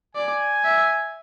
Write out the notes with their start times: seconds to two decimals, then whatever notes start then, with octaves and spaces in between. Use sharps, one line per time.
0.15 D5 G#5
0.65 E5